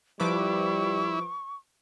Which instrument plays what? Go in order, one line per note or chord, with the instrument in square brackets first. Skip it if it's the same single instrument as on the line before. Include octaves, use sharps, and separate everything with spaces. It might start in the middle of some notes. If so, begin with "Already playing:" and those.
[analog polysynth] F3 B4 D6 [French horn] G3 [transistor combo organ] E4 [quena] C#6